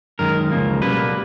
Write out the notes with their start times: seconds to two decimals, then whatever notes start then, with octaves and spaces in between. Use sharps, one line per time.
0.19 F#2 D#3 G#3 A#4
0.51 C#2 C#3 F3 A#3
0.82 B1 B2 G3 A#3 B4